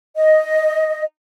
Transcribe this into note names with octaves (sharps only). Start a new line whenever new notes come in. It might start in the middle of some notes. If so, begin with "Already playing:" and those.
D#5